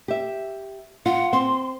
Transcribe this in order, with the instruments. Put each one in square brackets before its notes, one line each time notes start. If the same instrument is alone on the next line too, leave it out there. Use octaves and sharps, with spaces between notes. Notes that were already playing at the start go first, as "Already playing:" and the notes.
[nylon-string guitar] G4 E5
[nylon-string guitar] F4 [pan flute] F#5
[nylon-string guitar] C4 [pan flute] C6